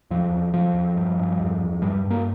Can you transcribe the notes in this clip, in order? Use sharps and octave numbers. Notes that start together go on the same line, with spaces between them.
E2 F3
E2
E2 F3
E2
G2
G2
E2
E2
G2 G3
G2
A#3